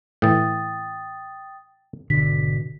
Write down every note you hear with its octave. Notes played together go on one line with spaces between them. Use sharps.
A2 E3 G5 D#6 A6
G#1 B2 D3 B6